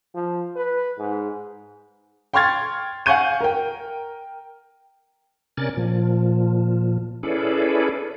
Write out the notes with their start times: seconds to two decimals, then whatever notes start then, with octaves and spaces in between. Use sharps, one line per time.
0.15 F3
0.56 B4
0.99 G#2
2.34 G5 C6 C#6 F6 G#6 A6
3.06 F5 F#5 G#5 C#6 G6 D#7
3.41 A#4 G5
5.57 C3 C#4 A#4 D5 G#5 A6
5.77 A#2 F3
7.23 C#4 E4 G#4 A4 B4 D5